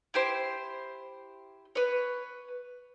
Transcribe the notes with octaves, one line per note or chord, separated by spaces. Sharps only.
E4 G4 C5
B4 C#5